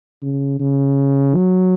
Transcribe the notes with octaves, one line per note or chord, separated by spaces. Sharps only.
C#3
C#3
F#3